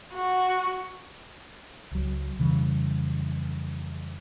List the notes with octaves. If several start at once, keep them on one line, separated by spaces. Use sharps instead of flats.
F#4
C#2 F#3
F2 C#3 E3 G3